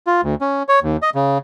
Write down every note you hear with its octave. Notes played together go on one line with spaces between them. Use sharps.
F4
D2
C#4
C#5
D#2
D#5
C#3